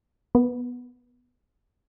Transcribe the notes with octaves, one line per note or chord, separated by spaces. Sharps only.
B3